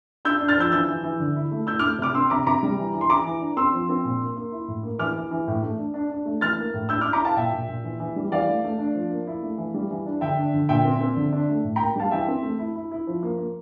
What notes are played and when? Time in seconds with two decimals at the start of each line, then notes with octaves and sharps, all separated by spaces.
0.25 D4 E6 G6
0.41 D4
0.48 F6 A6
0.57 F3 E6 G6
0.72 E3 E6 G6
0.89 E3
1.04 E3
1.20 D3
1.36 E4
1.51 A3
1.67 E4 E6 G6
1.79 A3 D6 F6
1.99 C3 D6 F6
2.14 C4 C6 E6
2.30 C3 A#5 D6
2.46 C3 A#5 D6
2.63 G3
2.78 E3
2.94 E3
3.01 C6
3.10 E3 A#5 D6
3.25 E3
3.41 D4
3.57 C4 C6 E6
3.73 F3
3.89 C4
4.05 A#2
4.21 A#3
4.37 A#3
4.52 E4
4.68 A2
4.83 A#3
4.99 E3 D6 F6
5.16 E3
5.31 E3
5.48 A2
5.62 A3
5.79 D4
5.94 D4
6.10 D4
6.26 A3
6.41 E3 F6 A6
6.58 A#3
6.74 A2
6.89 E4 E6 G6
7.01 D6 F6
7.05 E4
7.13 A#5 D6
7.21 E4 F5 A5
7.36 A#2 E5 G5
7.53 A#2
7.68 A#2
7.84 E3
8.00 E3
8.16 G3
8.32 E3 D5 F5
8.48 A3
8.64 A3
8.79 D4
8.95 F3
9.10 A#3
9.27 E4
9.43 A3
9.58 E3
9.74 G3
9.91 E3
10.06 D4
10.21 D3 E5 G5
10.37 D4
10.54 D3
10.69 A#2 E5 G5
10.85 C4
11.01 C4
11.16 D3
11.32 D4
11.49 A3
11.64 A2
11.76 A#3 G5 A#5
11.96 G3 F5 A5
12.11 E3 E5 G5
12.28 C4
12.43 A3
12.59 E4
12.76 E4
12.91 E4
13.07 F3
13.23 A#3
13.38 A#3